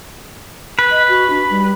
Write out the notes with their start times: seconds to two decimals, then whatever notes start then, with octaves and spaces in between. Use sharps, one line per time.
0.79 B4
0.91 D#5
1.08 F#4
1.30 D4
1.50 G3